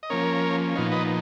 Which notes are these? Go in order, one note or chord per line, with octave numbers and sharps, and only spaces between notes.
D#5
F3 A#3 C#4 A#4 C#5
A#2 F3 B3 D#4 C#5 F5
B4 D#5